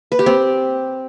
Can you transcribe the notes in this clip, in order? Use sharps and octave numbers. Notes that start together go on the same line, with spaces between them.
B4
G4
C4